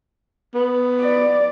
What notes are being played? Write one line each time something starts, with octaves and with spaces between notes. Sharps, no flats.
B3
D5